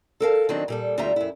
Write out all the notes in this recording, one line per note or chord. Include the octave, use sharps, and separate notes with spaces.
A4 A#4 F5 A5
D#3 E3 F#3 C4 D4 D#4
A#2 G3 A4
D2 G3 D#4 F4 E5 A#5
F#2 E4